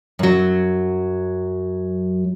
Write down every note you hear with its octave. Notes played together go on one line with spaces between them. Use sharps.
F#2 F#3